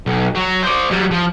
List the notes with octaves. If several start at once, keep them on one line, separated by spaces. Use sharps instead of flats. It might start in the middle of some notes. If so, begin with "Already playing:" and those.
B1
F#3
C5 D5
F#3 G3
F3